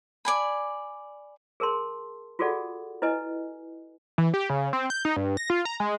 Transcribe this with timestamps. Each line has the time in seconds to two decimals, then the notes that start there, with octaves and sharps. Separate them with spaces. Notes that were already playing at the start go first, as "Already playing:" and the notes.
0.25 D5 G#5 B5
1.60 G#4 A#4 A5 C6
2.39 F4 F#4 G#4 A4 D5 F#5
3.02 E4 B4 D#5 G#5
4.18 E3
4.34 G4
4.50 C#3
4.73 C4
4.90 G6
5.05 D#4
5.17 G2
5.37 A#6
5.50 F4
5.65 A#5
5.80 G#3